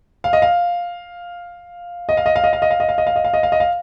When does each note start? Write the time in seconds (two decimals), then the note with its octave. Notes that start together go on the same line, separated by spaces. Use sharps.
0.24 F5
0.33 D#5
0.42 F5
2.09 D#5
2.17 F5
2.26 D#5
2.36 F5
2.44 D#5
2.53 F5
2.62 D#5
2.71 F5
2.80 D#5
2.89 F5
2.98 D#5
3.07 F5
3.16 D#5
3.24 F5
3.34 D#5
3.43 F5
3.52 D#5
3.60 F5